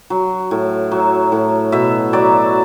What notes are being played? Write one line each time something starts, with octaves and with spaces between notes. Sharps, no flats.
F#3
A2
F#3
A2
B2 E5
F#3 D5